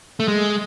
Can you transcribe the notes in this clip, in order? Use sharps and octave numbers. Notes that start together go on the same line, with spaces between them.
A3
G#3